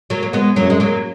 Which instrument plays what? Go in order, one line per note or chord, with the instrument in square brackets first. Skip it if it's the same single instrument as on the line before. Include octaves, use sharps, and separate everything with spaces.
[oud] F#3 A#3
A#3
G#3 B3
[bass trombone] F#2 [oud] F#3 A#3
[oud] G#3
F#3 A#3